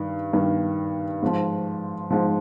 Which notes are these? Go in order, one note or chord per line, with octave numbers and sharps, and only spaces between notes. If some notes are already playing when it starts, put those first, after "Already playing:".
Already playing: G2 D#3
G2 D#3
G#2 F3
G#2 F3